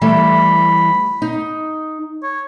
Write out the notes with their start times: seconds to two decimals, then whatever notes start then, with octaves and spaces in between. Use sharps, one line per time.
0.02 E3 G3 A3 B5
1.22 D#4
2.23 C#5